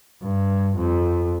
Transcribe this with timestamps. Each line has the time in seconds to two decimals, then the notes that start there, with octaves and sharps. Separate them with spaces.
0.23 G2
0.77 F2